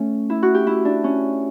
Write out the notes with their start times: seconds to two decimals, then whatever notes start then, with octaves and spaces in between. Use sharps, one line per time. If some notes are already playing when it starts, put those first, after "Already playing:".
Already playing: A3 C#4
0.30 E4
0.43 F#4
0.55 G4
0.67 E4
0.85 D4
1.04 C#4